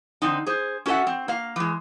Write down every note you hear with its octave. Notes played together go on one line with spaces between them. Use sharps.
D3 C4 D#4
G#4 C5
C#4 F#4 A4 B4 E5 F#5
C4
A#3 F5
E3 G#3